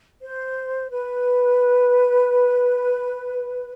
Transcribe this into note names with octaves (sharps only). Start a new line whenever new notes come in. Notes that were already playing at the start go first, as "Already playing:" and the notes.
C5
B4